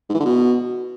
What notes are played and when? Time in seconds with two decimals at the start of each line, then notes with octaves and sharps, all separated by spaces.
0.09 G#2
0.15 E3
0.20 D3
0.25 B2